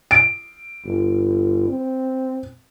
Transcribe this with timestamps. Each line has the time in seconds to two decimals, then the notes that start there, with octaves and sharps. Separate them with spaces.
0.11 D7
0.84 G1
1.68 C4